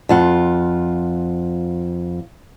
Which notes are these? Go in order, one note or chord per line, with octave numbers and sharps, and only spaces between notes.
F2 F4 F#5